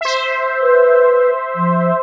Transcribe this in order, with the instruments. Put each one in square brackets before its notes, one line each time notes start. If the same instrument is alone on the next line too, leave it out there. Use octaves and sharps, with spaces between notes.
[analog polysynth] C5 E5
[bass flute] B4
F3